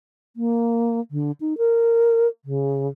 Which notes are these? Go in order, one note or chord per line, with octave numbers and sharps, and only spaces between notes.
A#3
D3
D#4
A#4
C#3